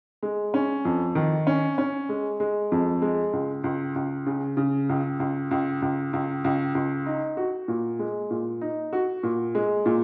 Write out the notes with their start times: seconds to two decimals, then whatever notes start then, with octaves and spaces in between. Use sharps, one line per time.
0.23 G#3
0.54 C#4
0.85 F2
1.15 D#3
1.47 C#4
1.78 C#4
2.09 G#3
2.40 G#3
2.72 F2
3.02 G#3
3.33 C#2
3.64 C#2
3.95 C#2
4.26 C#3
4.57 C#3
4.89 C#2
5.20 C#2
5.51 C#2
5.82 C#2
6.13 C#2
6.44 C#2
6.75 C#2
7.06 D#4
7.37 F#4
7.68 A#2
7.99 G#3
8.30 A#2
8.61 D#4
8.93 F#4
9.23 A#2
9.55 G#3
9.86 A#2